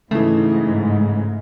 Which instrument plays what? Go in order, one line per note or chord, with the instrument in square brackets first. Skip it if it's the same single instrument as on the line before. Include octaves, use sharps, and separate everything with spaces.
[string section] G#2 [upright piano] C#3 E3 [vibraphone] G#3 D#4 [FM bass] A3